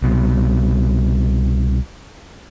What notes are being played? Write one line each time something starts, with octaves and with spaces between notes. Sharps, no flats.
C2 B2